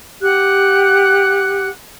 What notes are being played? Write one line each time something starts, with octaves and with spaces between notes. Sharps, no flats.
G4 F#5 F#6